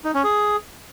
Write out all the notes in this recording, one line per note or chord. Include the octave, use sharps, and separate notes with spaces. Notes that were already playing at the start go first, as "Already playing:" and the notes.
D#4
C#4
G#4